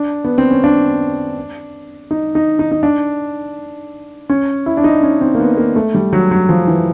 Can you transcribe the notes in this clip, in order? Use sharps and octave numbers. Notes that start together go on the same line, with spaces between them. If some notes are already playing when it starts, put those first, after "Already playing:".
Already playing: D4
B3
C4
C#4
D4
D#4
D#4
D#4
D#4
D4
C#4
E4
D4
D#4
C#4
C4
A#3
B3
A#3
A3
G3
F#3
F#3
F3
E3